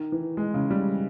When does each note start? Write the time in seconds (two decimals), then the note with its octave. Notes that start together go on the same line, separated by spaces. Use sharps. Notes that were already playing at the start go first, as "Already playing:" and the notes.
Already playing: D#3
0.12 E3
0.37 G#3
0.54 C#3
0.71 G3